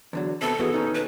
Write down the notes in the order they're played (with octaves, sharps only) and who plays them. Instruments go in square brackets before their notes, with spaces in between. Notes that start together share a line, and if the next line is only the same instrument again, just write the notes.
[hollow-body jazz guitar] E2 D3 F#3
[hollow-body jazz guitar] C3 B3 [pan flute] A4 [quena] A5
[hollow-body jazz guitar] B2 E3 F#4 [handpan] B3 [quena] G#4
[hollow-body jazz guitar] D#2 B2 C#4 [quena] D#4
[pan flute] B4